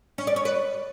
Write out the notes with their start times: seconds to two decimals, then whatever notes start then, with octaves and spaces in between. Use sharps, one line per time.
0.18 C#4
0.27 D5
0.36 C#5
0.45 B4